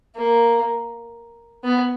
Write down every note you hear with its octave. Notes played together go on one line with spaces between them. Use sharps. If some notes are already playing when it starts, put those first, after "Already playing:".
A#3
B3